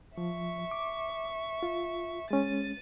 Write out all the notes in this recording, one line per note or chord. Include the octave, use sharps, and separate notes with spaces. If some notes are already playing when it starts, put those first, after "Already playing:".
F3 E5 C#6
D6
F4
G#3 C#4 A6 D#7